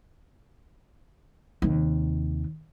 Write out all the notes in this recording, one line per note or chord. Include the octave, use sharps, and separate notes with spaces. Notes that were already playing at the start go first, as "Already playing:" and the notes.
D#2 C3